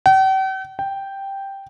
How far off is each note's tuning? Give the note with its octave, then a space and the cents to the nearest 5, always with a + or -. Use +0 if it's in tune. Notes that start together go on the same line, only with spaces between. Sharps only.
G5 -45
G5 +0